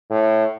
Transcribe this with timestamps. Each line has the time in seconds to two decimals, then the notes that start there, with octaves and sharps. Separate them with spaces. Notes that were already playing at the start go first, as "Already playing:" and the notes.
0.10 A2